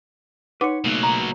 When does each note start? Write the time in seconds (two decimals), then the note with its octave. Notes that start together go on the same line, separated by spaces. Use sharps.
0.61 D#4 B4 C#5 F#5 D6
0.84 C#2 B2 F#3 A3 A#3
1.03 A#5